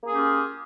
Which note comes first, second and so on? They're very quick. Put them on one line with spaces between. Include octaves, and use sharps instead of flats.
A#3 G#4 C#4 G4 F4